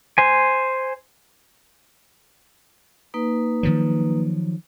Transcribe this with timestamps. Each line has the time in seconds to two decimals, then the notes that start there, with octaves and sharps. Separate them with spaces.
0.18 C5 G#5
3.14 A#3 D#4 B4
3.63 D#3 F3 F#3